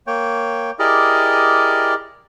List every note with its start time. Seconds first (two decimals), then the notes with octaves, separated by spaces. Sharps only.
0.07 A#3 C#5 G5
0.79 E4 G4 G#4 A#4 D5 D#5